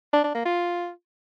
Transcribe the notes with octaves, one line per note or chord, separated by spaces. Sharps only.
D4
D4
A#3
F4